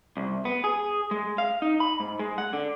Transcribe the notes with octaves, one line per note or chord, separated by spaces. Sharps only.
C2
B3
G#4
G#3
F5
D#4
B5
G#2
G#3
F#5
D3